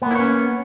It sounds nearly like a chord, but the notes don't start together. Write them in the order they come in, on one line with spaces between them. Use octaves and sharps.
B3 A#3 E4 C#5 C#4